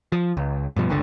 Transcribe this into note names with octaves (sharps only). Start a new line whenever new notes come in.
F3
C#2
G2 B2 F3
G1 C#2 D3